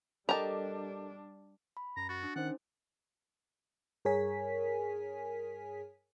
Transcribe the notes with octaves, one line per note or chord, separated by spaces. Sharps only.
G3 D4 G4 A4 A#4 D#5 A5 A#5
B5
F#2 A#5
F#4 A6
D4
D#3 C#4 D#4 C5 F#5
G2 G#4 A#4 C#5 G#5 B6